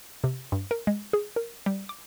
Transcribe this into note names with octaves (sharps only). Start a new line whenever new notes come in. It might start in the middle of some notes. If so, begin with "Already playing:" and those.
C3
G2
A#4
G#3
G#4
A#4
G3
D6